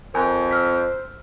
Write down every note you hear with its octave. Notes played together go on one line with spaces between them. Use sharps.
F2 A#4 C5 G#5
E6 F6 B6